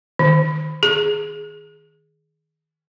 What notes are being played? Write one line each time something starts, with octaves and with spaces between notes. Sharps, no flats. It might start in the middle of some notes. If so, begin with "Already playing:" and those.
D#3
G#4